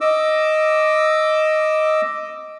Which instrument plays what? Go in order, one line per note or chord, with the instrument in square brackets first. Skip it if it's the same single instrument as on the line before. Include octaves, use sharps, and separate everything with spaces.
[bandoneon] D#5 D6 E6